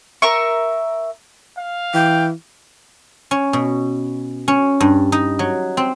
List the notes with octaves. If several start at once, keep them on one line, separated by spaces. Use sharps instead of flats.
A#4 E5 C#6
F5
E3 G5
C#4
B2
C#4
G2
D#4
F#3
C4